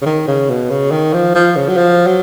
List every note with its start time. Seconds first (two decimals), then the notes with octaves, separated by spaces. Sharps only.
0.02 C#3
0.06 D#3
0.28 C#3
0.49 B2
0.70 C#3
0.91 D#3
1.14 F3
1.35 F3
1.56 C#3
1.69 F#3
1.77 F3
2.07 F#3